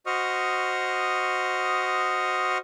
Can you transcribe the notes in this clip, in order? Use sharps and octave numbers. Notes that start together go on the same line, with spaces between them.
F#4 C5 D#5 C#6 D#6 F6